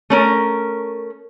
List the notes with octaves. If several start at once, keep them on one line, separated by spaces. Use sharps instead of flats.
A3 C#4 A#4